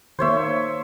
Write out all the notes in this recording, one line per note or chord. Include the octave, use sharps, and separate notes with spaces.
D#3 A#3 C5 C#5 E5